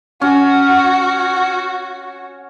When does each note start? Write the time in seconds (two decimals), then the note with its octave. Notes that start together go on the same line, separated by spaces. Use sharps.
0.21 C#4 F#4